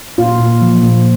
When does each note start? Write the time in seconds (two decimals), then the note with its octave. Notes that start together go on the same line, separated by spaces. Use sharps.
0.18 A#2 F4
0.39 A#2
0.62 F3
0.83 A#2